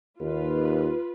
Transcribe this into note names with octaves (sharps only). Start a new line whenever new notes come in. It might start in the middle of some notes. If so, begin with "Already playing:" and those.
D#2 F4 B4